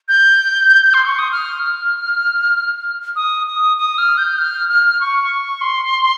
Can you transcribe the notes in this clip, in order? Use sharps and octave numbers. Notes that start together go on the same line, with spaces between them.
G6
C6
C#6
D#6
F6
F6
D#6
D#6
D#6
F6
G6
F6
F6
C#6
C6